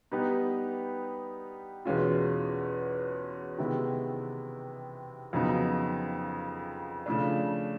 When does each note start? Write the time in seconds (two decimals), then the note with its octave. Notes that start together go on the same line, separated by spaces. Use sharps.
0.12 G3 B3 D#4 G4 B4
1.85 E2 B2 G#3 C#4 F4
3.58 C3 D#3 G#3 B3 E4
5.33 F2 C#3 F#3 B3 D#4
7.06 C#3 F3 A3 D4